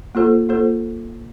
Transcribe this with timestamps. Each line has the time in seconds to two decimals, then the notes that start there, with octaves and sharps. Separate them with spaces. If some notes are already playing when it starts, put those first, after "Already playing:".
0.15 A#3 F4 A4 C5
0.49 A#3 F4 A4 C5